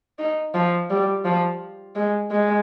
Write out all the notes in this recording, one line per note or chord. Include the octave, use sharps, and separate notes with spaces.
D#4
F3
G3
F3
G#3
G#3